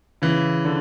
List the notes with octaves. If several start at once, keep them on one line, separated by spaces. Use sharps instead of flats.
C#3 E3
D3